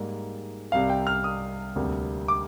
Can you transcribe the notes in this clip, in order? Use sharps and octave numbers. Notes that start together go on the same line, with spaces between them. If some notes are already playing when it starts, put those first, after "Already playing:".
Already playing: G#2 G3 A#3
C2 C3 G3 F5
G5
F6
D#6
D2 C3 G3 A#3
D6